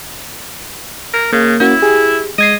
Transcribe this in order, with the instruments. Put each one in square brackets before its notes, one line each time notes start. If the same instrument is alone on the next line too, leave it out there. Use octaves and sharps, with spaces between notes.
[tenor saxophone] A#4
[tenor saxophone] C#3 [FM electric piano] A#3
[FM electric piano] A#3 C#4 F#4 [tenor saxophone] E4
[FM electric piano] G4 G#4
[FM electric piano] G#3 G#6 C7 [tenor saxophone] D#5